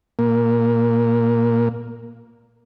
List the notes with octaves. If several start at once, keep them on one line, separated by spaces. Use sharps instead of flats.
A#2 A#3